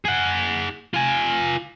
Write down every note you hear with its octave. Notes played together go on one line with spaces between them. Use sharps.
G#4 F#5
F4 G#5